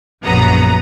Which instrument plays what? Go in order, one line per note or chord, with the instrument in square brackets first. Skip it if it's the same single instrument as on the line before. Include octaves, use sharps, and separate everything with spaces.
[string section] A#1 F#2 B3 A#5 D#6